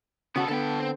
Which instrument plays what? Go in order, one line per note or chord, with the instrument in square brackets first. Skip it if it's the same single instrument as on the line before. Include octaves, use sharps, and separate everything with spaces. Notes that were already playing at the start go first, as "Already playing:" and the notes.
[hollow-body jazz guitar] C#3 F#4 [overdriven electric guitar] B3 A4
[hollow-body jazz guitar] D3 B3 [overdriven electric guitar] A4 G5
[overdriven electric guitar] C4